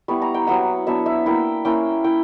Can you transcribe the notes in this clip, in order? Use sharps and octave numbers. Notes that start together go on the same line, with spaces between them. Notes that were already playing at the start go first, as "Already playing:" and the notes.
G3 B3 E4 C#6
A#5
G5
F#3 B3 E4 F#5
F#3 B3 D4 E5
E5
A#3 E4 G5
A#3 C#4 E4 G5
E4 G5